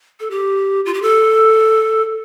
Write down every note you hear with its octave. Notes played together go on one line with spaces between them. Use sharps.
A4
G4
F4
G4
A4